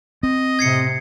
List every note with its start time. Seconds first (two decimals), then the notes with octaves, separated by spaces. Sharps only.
0.23 C4 D#5
0.59 A2 C3 G#6 C7 C#7